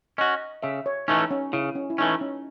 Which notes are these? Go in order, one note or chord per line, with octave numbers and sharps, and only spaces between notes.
C#4 F#4 D#5
C#3 E5
C#5
E3 A3 C#4 D#4
C#4
C#3 E4
C#4
E4
E3 A3 C#4 D#4
C#4